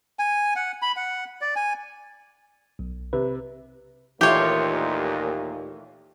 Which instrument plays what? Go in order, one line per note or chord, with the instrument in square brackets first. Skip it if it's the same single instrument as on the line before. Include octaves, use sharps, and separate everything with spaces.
[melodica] G#5
F#5
B5
F#5
D5
G#5
[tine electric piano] B1
[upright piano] C3 [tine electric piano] B4
[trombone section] D#2 A#2 [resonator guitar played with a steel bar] E3 A3 F4 [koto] G4 C#5